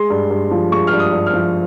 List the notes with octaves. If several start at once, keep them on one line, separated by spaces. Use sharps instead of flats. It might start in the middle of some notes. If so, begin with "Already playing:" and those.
Already playing: G#3 C6
G2
G2
F3
G#3 C#6
F6
G2
D#6
G2
F6
F3